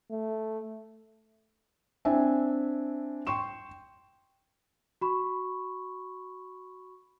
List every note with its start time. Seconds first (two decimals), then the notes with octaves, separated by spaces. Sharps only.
0.11 A3
2.05 C4 D4 E4 E5 G#5
3.27 G5 C6 C#6 E7
5.01 F#4 B5 C#6